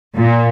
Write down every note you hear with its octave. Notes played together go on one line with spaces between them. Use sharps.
A#2